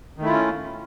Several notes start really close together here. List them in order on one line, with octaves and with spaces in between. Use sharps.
D#3 A3 E4 F4 C#4